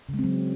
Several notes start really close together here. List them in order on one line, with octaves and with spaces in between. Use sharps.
C#3 G#3 C4 F#3